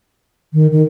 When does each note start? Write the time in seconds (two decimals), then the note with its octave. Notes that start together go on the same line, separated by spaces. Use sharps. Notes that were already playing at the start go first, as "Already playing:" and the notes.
0.54 D#3
0.71 D#3